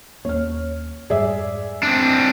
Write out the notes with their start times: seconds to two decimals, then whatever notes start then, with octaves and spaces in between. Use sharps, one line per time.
0.25 D#2 A#3 C#4 C#5 F6
1.10 F2 G#2 G3 G#4 D5 E5
1.83 C4 D4